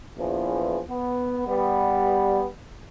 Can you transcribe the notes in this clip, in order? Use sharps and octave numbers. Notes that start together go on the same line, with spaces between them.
A#1 E2 E3 F3
B3
G3 B3